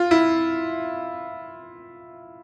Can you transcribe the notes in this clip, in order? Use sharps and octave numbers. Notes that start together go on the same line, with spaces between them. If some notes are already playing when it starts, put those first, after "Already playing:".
Already playing: F4
E4